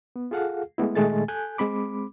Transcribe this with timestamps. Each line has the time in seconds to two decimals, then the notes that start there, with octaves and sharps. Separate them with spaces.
0.16 B3
0.31 F4 G#4 A4 F5 F#5
0.78 G#3 A3 B3 E4
0.95 A#2 D#3 G#3 A3 G#5 A6
1.28 A4 G#5 F#6 G6
1.58 G#3 C4 B5 D6